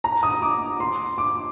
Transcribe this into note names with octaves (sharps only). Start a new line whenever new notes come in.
A#5
D#6
D6
C6
D6